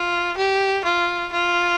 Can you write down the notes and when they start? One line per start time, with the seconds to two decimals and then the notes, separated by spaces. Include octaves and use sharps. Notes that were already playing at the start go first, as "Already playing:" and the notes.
Already playing: F4
0.37 G4
0.85 F4
1.32 F4